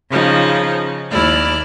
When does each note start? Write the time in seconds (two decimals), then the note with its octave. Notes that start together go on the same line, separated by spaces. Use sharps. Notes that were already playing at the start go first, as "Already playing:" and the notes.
0.10 C#3 F3 D#4
1.12 D#2 E4 D5 F6